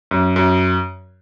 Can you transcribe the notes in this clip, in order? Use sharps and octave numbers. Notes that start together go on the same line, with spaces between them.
F#2
F#2